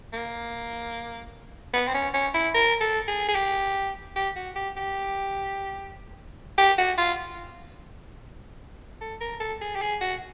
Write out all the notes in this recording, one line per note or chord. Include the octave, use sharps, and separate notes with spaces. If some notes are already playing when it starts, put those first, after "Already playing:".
A#3
B3
C4
C#4
C#4
E4
A#4
A4
G#4
G#4
G4
G4
F#4
G4
G4
G4
F#4
F4
A4
A#4
A4
G#4
G4
G#4
F#4